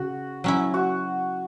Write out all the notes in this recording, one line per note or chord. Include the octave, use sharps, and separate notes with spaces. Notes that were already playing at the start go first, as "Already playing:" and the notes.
Already playing: C#3 F#4
F#3 C#4 E4
F#4